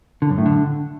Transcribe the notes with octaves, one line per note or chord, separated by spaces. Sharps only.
D3
F#2
A2
D3